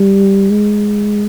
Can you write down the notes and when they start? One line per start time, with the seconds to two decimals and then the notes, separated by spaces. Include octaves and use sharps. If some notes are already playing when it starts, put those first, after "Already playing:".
Already playing: G3
0.50 G#3